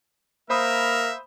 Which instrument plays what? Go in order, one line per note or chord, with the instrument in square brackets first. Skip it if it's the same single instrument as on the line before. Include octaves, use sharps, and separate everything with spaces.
[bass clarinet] A#3 [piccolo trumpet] A#4 [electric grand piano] C5 B5 D#6 [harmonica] E5